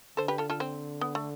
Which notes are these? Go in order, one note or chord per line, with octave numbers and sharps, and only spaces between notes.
D3 A4 C5
G4 B4
F4 A4
F4 A4
C4
B3
A3